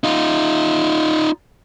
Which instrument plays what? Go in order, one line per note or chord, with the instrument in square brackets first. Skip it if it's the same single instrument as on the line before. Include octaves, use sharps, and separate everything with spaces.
[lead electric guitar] D#4 F4